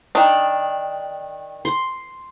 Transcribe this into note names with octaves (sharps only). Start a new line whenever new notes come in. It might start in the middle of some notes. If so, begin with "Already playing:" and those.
D#3 D4 G5 D#6
C6